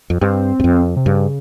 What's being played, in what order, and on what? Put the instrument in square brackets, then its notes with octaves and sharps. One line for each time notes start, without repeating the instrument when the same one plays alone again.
[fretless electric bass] F2
[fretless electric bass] G2 [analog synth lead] C4
[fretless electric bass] G2
F2
[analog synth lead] C3
[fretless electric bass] G2 [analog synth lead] C#3